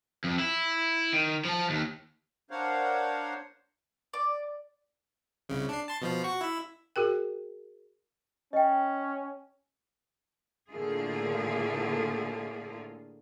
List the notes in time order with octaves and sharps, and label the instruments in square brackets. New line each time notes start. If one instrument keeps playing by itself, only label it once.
[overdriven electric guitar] F2
E4
D#3
F3 A5
D#2
[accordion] D4 A#4 C5 C#5 F5 F#5
[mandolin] D5
[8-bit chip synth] C2 C#3
D4 C7
A5 C6 A6
B2 F3 C5
F#4 C#6
E4 E5
[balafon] F#4 G#4 A#4 G5
[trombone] C#4 [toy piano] D#5 G5
[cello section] A2 D3 A3 A#3 F4 G#4